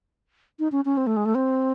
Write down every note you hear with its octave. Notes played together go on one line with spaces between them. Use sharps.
D#4
C#4
C#4
C4
A3
G#3
A3
C4